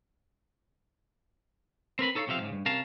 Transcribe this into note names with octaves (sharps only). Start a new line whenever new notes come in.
C4 A#4 B4 B5
D#4 A4 C#5 D5 F5
B1 C3 F3 E5 F5
G#2 C#3
G2
C3 C#4 A#4 F5 A5